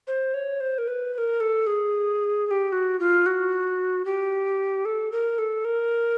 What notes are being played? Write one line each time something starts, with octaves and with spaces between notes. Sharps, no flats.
C5
C#5
C5
A#4
B4
B4
A#4
A4
G#4
G#4
G4
F#4
F4
F#4
G4
A4
A#4
A4
A#4